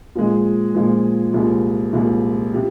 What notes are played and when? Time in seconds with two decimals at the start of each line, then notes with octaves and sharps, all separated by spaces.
0.15 A#2 F3 G#3
0.74 A#2 F3 G#3
1.34 C2 A#2 F3 G#3
1.93 C2 A#2 F3 G#3
2.54 C3 F3